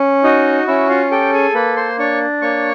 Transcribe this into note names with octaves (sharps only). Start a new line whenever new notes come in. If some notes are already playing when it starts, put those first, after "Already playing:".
Already playing: C#4
D#4 F#4 D#5
C#4 E4 E5
F4 F5
G4 A4 G5
G#4 G#5
A#3 B4 B5
C5 C6
D4 C#5 C#6
A#3 C#5 C#6